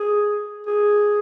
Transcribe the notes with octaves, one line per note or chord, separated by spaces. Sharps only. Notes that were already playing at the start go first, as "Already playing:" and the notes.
Already playing: G#4
G#4